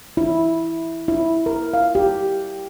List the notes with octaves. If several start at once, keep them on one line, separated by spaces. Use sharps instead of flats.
E4
E4
A#4
F5
G4